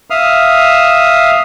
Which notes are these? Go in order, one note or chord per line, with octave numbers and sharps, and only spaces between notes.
E5 F5 D#6 F6